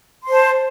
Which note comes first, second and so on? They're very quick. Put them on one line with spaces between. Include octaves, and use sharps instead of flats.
C6 C5 A5